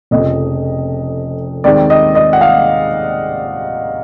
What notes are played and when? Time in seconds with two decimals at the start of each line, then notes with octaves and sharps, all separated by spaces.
0.11 F1 F2 C#3 D#5
1.64 D#2 D#3 G#3 C4 D5
1.90 D#5
2.15 D#5
2.33 F#5
2.41 F5